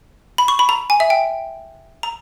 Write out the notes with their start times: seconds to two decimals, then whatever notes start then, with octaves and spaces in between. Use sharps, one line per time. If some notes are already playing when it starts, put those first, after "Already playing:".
0.38 B5
0.48 C#6
0.59 B5
0.69 A#5
0.90 G#5
1.00 E5
1.10 G5
2.03 A#5